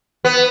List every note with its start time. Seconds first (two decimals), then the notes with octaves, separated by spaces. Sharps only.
0.25 B3